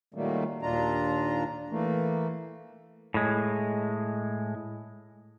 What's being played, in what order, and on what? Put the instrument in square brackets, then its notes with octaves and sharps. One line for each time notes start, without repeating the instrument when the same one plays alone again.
[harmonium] A#2 D#3 F#3 G3 A3 A#3
D#2 A#2 D4 F4 A#5
E3 A3 A#3
[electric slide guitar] A2 G#3